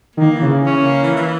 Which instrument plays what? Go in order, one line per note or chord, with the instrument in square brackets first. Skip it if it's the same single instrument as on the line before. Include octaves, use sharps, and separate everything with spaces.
[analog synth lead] D#3 [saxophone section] A#3
[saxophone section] E3
[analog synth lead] C#3
[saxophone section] E3
C#4
A#3
E3
E3